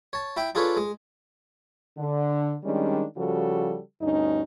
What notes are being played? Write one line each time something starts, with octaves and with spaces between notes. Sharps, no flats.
C#5 A5
E4 E5 G5
D4 F4 G#4 A4 B4 C#5
G#3
D3
D#3 G3 G#3 C#4 D4
C#3 F3 G3 F#4 A4
D2 G2 C#4 D#4